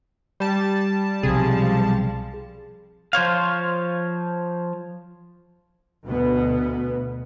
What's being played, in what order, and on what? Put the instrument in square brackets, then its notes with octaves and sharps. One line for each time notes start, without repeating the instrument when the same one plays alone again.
[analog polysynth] G3 A5
[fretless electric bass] B1 C3 [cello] F3 [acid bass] G#4
[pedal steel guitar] F3 C5 C#5 F5
[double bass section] D2 B2 B3